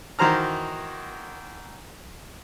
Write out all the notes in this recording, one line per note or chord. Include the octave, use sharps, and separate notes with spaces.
D#3 E3 F#4 C5 A#5 F6